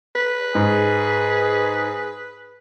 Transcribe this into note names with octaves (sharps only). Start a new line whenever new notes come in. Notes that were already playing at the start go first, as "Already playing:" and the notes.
B4
G#2 G#4